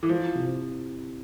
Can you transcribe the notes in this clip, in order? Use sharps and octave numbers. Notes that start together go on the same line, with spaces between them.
E3
F3 E4
C3